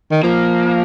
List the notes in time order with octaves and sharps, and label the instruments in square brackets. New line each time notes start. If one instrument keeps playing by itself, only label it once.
[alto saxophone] D#3
[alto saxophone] F3 [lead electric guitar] A#3